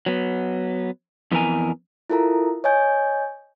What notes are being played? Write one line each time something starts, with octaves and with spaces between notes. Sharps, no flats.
F#3 B3
F2 E3 B3 A#4 G#5
E4 F4 A4 A#4 A#5
C#5 D#5 G#5 G6